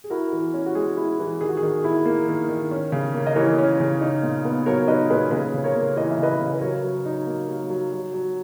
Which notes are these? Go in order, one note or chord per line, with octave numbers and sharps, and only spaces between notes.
G#4
E4 F#4 A#4
E3
C#4
F#4
G#3 G#4
E4
E3
D#3 G#4
F#4
G#4
D#3
E4
A#3
D#3
D#3
C#4
C#3
A#3
D#5
E3 A#4 C#5
C#4
C#3
D#4
A#2
B3
F#3 A#4 C#5
D#4 B4 D#5
A#2 G#4 B4
C#3 G#4 B4
C#3
A#4 C#5
A#3
E3 D#5
E5
C#3 B4 D#5
C#3
B4
F#3 A#4 C#5
F#3
D#4
A#3
F#3
F#3
F#3
F#3